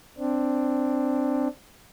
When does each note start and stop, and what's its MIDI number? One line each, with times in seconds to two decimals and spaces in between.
0.18 1.48 60
0.18 1.48 62